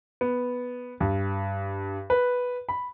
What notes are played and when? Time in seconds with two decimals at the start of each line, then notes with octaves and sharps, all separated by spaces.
0.21 B3
1.00 G2
2.10 B4
2.69 B5